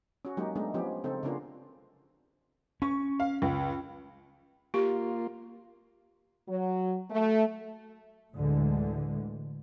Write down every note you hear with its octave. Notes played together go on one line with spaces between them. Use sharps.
C#4 F#4
F#3 G#3 A#3 D#4 G4
G#3 A3 B3 D4 D#4
F3 B3 C#4 D#4 G4
C#3 C4 D#4 A4
C#3 B3 C#4 D4 F4 A#4
C#4 C#6
F5
C#2
A#3 F4 G4
F#3
A3
D2 A2 D3 E3 G#3